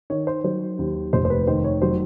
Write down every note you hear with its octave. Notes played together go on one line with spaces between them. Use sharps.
D#3 C#5
C5
F#3 C5
D#2
F1 C5
C5
B4
D#3 C5
C#5
F#3 C5